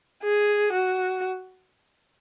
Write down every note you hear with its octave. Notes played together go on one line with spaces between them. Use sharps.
G#4
F#4